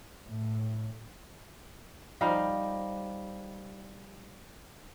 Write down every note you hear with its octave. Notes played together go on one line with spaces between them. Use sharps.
A2
F3 G3 D#4 F5